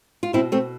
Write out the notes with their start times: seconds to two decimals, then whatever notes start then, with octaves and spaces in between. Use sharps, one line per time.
0.23 F4
0.33 B2 C4 E4
0.52 A3 C4